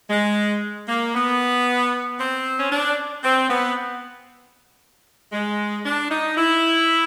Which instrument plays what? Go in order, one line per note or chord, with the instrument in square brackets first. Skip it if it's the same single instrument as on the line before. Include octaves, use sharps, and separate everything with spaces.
[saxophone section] G#3
A#3
B3
C4
C#4
D4
C4
B3
G#3
D4
D#4
E4